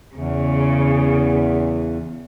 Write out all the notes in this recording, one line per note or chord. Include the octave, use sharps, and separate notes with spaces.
E2 C#3